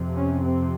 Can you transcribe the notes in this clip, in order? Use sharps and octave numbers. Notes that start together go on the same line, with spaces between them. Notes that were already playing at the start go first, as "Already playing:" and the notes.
Already playing: F2 C3
C#4
C4